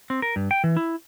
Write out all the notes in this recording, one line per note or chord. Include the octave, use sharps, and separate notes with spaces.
C4
A#4
G2
G5
E3
E4